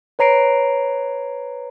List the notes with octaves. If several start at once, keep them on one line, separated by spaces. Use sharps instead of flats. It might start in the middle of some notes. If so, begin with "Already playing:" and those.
B4 C#5 A#5 C7 D7